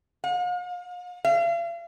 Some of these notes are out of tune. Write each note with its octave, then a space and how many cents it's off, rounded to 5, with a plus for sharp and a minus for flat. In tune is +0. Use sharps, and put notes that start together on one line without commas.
F5 +45
F5 -40